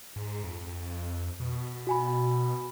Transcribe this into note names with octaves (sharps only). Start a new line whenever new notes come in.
G#2
F2
B2
F#4 G#5 B5